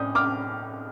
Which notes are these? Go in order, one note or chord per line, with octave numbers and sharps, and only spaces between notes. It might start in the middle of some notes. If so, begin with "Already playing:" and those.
Already playing: A2 D#6 G6
D6 F6